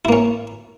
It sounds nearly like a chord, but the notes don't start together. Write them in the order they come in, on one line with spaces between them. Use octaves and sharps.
E4 A#3 C#4